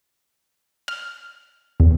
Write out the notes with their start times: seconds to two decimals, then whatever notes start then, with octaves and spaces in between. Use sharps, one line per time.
0.88 F6
1.80 E2